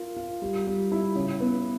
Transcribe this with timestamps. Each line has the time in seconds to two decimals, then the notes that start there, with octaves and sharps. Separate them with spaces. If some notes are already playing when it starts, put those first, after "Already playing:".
Already playing: F4 A#4
0.17 F4
0.42 G3
0.67 G3
0.92 E4
1.15 C#3
1.40 B3